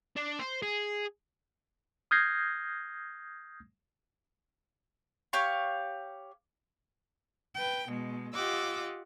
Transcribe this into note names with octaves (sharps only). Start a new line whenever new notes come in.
D4
C5
G#4
D#6 F6 G6 G#6 A#6 C7
G4 C#5 F5 C#6
B4 G5
B2 G#3
F4 G4 D#5 F#5 D6 E6